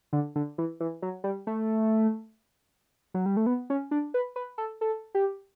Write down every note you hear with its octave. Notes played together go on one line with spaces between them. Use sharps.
D3
D3
E3
E3
F#3
G3
A3
F#3
G3
A3
B3
C#4
D4
B4
B4
A4
A4
G4